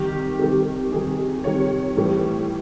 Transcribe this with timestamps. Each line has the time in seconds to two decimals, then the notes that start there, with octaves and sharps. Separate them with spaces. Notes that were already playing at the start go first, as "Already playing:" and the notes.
Already playing: C3 D#3 G3 G4
0.39 C3 D#3 G3 G4
0.92 C3 D#3 G3 G#4
1.44 C3 D#3 G3 C#5
1.97 A2 E3 G3